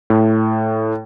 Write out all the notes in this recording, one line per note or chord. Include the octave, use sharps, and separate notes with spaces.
A2